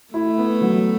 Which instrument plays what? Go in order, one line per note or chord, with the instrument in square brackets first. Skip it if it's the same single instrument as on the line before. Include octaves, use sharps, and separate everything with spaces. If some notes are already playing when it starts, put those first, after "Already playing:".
[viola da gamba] A3 [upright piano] E4
[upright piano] B3
F#3